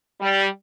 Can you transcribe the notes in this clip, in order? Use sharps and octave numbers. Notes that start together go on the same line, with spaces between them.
G3